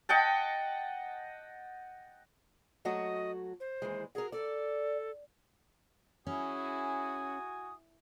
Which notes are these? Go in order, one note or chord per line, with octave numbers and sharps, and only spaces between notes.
D#5 F#5 G5 A5
F#3 A3 F#4 D#5
C5
D#2 E3 G#3
F#4 G#4 A#4
A4 D5
C#4 E4 F#4 G#4 G#5 D#6